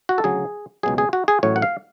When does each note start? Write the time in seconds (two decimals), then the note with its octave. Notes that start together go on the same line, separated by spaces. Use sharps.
0.09 F#4
0.18 A4
0.24 D2 C#3 F#3 G#4
0.83 C#2 B2 F#3 G#4
0.98 G#4
1.13 F#4
1.28 G#4
1.43 A1 A2 F#3 C#5
1.56 F#5
1.62 F5